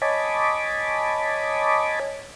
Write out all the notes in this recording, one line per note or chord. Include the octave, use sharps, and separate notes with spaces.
C#5 D#5 G#5 A5 B5 D6